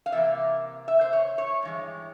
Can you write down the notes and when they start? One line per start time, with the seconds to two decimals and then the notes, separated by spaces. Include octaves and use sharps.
0.06 F5
0.12 C3 E3 A#3 E5
0.88 E5
1.01 C5
1.13 C#5
1.38 C#5
1.63 G2 E3 G#3